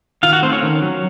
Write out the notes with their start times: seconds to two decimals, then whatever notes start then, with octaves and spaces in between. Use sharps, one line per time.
0.23 D#3 F4 F5
0.33 F#4 F#5
0.42 A3 C4 C5
0.52 C#4 C#5
0.63 D#3
0.82 F#3